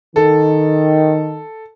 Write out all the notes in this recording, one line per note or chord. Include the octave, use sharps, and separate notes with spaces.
D#3 A4